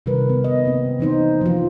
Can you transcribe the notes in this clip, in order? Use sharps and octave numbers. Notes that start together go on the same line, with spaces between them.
C3 D#3 G3 A#4 B4
B3
D#5
A#3 C4
E3 C4 D#4 C5
F3 D#4 F4